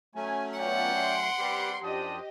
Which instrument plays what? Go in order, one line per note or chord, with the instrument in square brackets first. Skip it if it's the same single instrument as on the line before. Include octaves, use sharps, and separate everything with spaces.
[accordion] F#3 A3 C#4 [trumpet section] G#5
[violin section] B3 F4 [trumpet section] D5 E5 G5 [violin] F#5
[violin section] C6 D7
[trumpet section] G3 C4 B4 [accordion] G4
[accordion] F#2 F3 [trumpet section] D4 C5 D#6 [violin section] G4 D#5